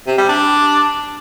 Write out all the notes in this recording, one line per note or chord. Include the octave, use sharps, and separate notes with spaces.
C3
G3
D4